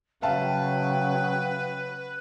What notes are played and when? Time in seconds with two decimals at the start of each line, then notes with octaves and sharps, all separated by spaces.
0.22 C#3 F#3 B4 E5 F5 G5 A5